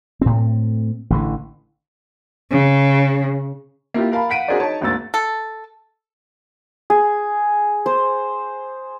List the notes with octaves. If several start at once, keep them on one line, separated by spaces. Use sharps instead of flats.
A2 C4
A1 D3 E3
C#3
A#3 E4 F4 G4
A#4 F5 A5 B5
F5 F#5 B6 D7 D#7
D4 F#4 G#4 A#4 C5 D5
D#4 C#5 A5
G#1 D2 G#2 A#3 E6 A6
A4
G#4
C5